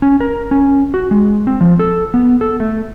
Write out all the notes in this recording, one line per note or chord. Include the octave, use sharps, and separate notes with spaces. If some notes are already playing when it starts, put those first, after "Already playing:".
C#4
A#4
C#4
F#4
G#3
C4
F3
A4
B3
A4
A3